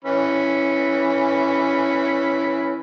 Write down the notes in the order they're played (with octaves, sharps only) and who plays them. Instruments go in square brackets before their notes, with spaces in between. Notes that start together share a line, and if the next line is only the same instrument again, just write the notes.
[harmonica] E3 C#4 B5